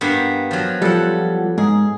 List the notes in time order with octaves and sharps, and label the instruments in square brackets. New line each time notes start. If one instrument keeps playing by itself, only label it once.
[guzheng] G2 A#3 B3
F3 F#3
[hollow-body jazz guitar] F3 G3 [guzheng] A4 F#5
[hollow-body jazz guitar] G#2 [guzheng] G#4